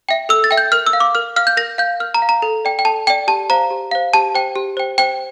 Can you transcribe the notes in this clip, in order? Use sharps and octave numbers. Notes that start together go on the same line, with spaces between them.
E5 G5
A4 E6
A6
E5 G5
G6
A#4 F6
E6
F5
D6
A#4 F6
F5 F6
G6
A#4 A#6
F5 G6
A#4 F6
A#5
F5
A#5
A4
D5 G5
G5
A4 A5
D5 G5
G4 A5
C5 F5 A#5
G4
C5 F5
G4 A5
C5 G5
G4
C5 G5
C5 G5